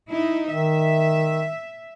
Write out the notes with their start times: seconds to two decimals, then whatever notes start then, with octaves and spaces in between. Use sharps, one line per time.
0.11 D#4 E4
0.50 D#3 E5